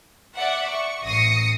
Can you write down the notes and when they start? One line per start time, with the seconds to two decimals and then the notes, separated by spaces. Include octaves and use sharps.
0.36 D5 E5 F#5
0.70 C#6
1.05 A1 D#6 A#6 C7 C#7